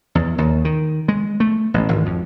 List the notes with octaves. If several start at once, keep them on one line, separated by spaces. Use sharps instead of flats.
E2
D#2
D#3
G#3
A3
A1
G#1
F2